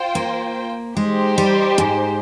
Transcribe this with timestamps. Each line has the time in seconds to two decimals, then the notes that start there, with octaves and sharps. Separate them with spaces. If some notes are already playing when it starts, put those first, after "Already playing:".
Already playing: F4 C5 G5
0.15 A#3
0.96 G#3 D#4 G4 C5
1.38 G3
1.78 G#2